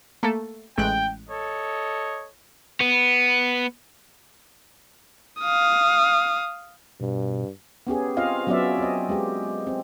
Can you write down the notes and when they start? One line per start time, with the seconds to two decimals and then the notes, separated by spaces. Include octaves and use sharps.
0.23 A3 A#3 A4
0.78 A1 G#3 G5 F#6
1.30 A4 C#5 D#5
2.80 B3
5.41 F5 D#6
7.00 G2 B2
7.87 B3 C#4 G4 G#4
8.17 C4 F4 C5 D#5 F5
8.47 F#3 B3 C#4 F4 D5 E5
8.78 C4 D#5
9.09 G#3 G4
9.67 C4